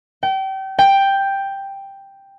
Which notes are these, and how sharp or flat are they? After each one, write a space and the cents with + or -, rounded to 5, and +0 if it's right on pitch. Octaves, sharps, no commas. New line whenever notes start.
G5 -30
G5 +5